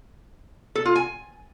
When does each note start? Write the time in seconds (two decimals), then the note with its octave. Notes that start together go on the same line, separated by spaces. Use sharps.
0.75 A4
0.85 F4
0.95 G#5